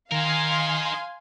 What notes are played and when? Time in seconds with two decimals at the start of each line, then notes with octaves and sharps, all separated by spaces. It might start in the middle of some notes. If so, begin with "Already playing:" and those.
0.12 D#3 D#4 A#4 F5 G#5 C6